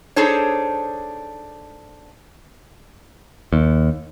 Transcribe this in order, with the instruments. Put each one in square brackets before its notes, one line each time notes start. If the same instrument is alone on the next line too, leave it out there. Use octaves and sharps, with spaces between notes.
[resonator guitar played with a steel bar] D4 D#4 G#4 A4 C5 C#5
[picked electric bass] D#2